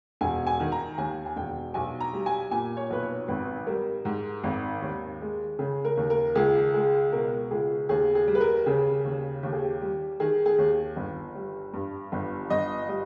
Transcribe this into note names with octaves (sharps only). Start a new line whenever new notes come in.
E1 G#5
G#5
D#3
A#5
D#2 G#5
G#5
E1 G5
B1 G#5
A#5
G3
G#5
A#2 G#5
C#5
B1 B4
C#5
G#1 B4
G3 A#4
G#2
G#1
D#2
G#3
C#3 G#4
A#4
D#2
A#4
C#2 G#4
G#3 G#4
B2 A#4
C#2 G#4
D#2 G#4
G#4
G3
B4
A#4
C#3 G#4
D#2
D#2 G4
G#4
G4
G3
D#3 G#4
G#4
D#2
G1
G3
G2
G1
G1 D#5
G3 D#5